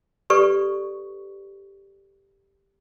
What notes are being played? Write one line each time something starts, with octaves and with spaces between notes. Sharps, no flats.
G4 A4 B4 D5 C#6